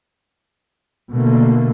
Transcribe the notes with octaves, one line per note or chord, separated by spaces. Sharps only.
B2 D3 A3 A#3